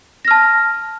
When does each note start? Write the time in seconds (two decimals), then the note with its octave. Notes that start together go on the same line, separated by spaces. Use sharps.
0.25 A#6
0.28 F6
0.31 A5